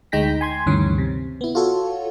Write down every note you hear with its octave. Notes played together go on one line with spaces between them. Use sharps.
D2 G#3 D#4 G5 A#6 B6
G#5 C6 G#6
D2 G2 D#3 E3 C#4
C3
B3 E4
F4 F#4 A4 C#5